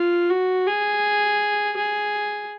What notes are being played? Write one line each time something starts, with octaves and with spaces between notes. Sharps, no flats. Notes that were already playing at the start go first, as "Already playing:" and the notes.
Already playing: F4
F#4
G#4
G#4